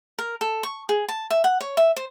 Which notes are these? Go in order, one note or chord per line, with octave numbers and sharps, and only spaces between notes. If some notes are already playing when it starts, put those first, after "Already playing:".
A#4
A4
C#6
G#4
A5
E5
F#5
C#5
E5
C5